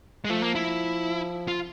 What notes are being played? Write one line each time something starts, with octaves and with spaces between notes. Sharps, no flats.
G#3
F3 A3
A#3
E4
F4